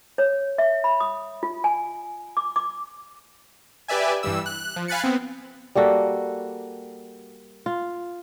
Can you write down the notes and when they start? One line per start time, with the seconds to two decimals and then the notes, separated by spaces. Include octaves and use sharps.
0.18 C#5
0.58 E5
0.84 B5
1.00 D#6
1.43 F4
1.64 G#5
2.37 D6
2.56 D6
3.88 G4 B4 D5 E5 G#5
4.23 G2 E3 G3 E6
4.46 F#6
4.76 F3
4.88 F5 G#5 B5 F#6 A6 C#7
5.04 B3 C4
5.75 G3 A#3 F#4 A4
7.66 F4